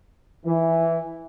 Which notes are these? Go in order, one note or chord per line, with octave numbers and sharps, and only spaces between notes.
E3